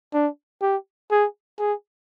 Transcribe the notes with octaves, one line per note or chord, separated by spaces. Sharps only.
D4
G4
G#4
G#4